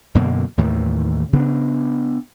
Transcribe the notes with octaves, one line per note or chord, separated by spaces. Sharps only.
F#2 B2 D3 A#3
D#2 A2 D#3 E3
C#3 B3 D4